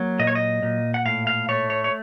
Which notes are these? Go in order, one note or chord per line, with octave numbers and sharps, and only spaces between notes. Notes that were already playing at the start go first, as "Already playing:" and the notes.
Already playing: F#3 A#3
A#2 D#5
C#5
D#5
A#2
F#5
A2 F5
F5
A3 C#5
C#5
C#5